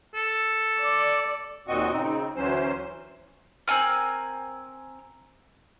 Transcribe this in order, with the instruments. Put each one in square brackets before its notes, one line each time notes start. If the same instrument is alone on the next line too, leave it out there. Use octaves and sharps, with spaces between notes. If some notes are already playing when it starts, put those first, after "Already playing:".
[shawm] A4
[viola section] D5
[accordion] D#2 A#2 C4 F#4 D#5 C#6
C#3 C4 D#4
D2 E3 F#3 C#4 C5
[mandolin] C4 A#4 G#5 F6